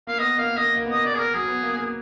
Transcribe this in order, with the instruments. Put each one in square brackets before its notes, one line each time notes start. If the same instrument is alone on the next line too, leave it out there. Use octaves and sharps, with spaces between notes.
[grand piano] A#3 [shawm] F5
[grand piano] B3 [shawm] D#5
[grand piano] A#3 [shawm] F5
[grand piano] A#3 [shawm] D#5
[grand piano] A#3
[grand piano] B3 [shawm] D#5
[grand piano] A#3
[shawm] D5
G#4
A#4
[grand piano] F#3 [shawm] G#4
[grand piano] B3
A#3
A#3